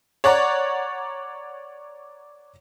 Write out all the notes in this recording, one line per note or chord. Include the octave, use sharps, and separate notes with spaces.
C#5 D5 F#5 A#5